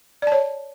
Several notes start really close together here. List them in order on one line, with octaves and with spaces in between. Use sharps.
D5 A5 C#5